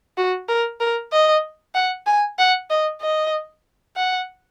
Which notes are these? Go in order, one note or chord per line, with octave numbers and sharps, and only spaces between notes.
F#4
A#4
A#4
D#5
F#5
G#5
F#5
D#5
D#5
F#5